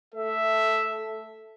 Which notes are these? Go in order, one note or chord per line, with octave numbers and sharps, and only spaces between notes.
A3 A4 E5